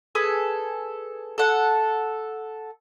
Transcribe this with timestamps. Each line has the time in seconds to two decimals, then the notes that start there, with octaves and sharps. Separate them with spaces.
0.15 G#4 A4 B4
1.38 A4 F#5